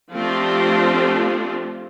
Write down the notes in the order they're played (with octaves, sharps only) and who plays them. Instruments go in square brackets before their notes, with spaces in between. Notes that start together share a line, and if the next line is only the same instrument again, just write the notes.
[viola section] F3 A3 C4 D4 F4 G4